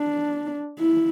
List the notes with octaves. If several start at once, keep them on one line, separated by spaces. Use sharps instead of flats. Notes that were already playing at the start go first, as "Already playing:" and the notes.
Already playing: D4
E4